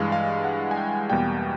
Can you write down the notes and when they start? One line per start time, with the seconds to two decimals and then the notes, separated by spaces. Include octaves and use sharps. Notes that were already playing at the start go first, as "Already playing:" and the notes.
Already playing: G2 E3 G#3 F5
0.12 F5
0.44 F#5
0.71 G#5
0.77 G5
1.10 E2 B2 G3 A#3 G5